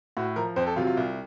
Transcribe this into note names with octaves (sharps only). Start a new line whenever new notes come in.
A2 F#4
F3 A#4
F2 C5
A4
C3 F#3 F4
F4
C2